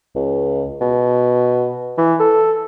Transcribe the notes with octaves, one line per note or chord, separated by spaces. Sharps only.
C#2
B2
E3
A4